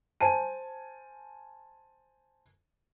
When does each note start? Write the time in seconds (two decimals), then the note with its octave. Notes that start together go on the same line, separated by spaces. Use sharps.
0.21 C5 G#5 A5 D#7